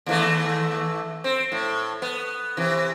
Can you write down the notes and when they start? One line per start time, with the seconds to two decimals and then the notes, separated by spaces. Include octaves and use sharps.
0.06 D#2 E3 A3
1.24 C4
1.52 A2
2.02 B3
2.57 C3 E3